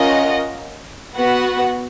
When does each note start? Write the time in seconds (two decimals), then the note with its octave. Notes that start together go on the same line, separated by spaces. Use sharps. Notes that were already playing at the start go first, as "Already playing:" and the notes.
Already playing: C#4 F4 A#4 D#5 F#5
1.15 B3 F#4 B4 F#5